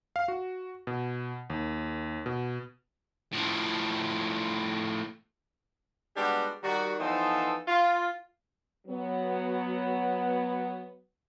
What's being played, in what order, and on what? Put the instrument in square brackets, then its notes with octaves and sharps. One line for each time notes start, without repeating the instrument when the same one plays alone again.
[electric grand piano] F5
F#4
B2
D#2
B2
[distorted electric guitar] A2 F3
[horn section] G3 G#3 B3 D4 F#4 G4
D#3 G3 F#4
E3 F3 B3 D#4 A4 C5
F4
[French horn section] F#3 B3